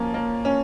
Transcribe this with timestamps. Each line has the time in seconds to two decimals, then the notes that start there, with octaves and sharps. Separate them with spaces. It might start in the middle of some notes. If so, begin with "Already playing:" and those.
Already playing: F3 A#3 C#4
0.14 A#3
0.45 C#4